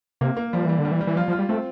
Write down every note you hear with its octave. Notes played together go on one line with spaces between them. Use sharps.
C3 A#3
A#3
F3 G3
E3 G3
D3
G3
E3
G3
E3
F3 F4
F3
F4
G3
A3 C4